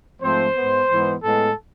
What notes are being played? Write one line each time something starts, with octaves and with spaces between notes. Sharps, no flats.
G#2 F3 A3 C4 C5
G#2 G#3 B3
G#2 E3 G#3 B3
A2 G#3 B3 A4